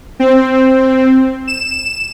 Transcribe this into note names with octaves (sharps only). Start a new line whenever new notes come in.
C4
E7